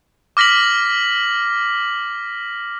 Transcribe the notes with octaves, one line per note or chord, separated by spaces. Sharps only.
D6 F6 A#6 B6 F#7